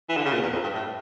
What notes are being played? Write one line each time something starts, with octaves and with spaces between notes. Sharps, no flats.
E3
D3
C#3
A#2
E2
F2
G2
A2